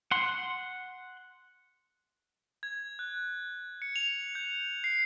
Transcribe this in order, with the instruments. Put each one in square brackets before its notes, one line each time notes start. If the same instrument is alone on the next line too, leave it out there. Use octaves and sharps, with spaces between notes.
[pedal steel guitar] F#5 C6
[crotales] G#6
F#6
C#7
F7
G6
C7